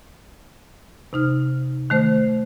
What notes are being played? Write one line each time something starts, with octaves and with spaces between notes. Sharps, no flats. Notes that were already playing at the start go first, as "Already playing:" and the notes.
C3 D#4 F6
D#3 A3 C5